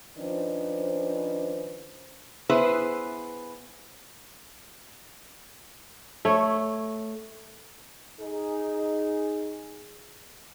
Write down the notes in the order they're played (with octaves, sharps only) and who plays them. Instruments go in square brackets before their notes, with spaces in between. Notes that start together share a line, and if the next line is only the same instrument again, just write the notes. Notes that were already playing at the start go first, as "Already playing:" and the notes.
[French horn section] D#3 F3 C#4 D4 B4 C5
[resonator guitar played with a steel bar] B3 E4 G#4 B4 C5
[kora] A3 C#5
[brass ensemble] D#4 G#4